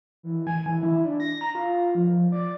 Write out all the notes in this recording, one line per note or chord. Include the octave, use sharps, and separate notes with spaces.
E3
G#5
E3
E4
D4
A#6
A#5
F4
F3
D5